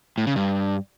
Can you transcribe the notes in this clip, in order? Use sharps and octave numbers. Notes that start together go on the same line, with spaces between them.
A2
C#3
G2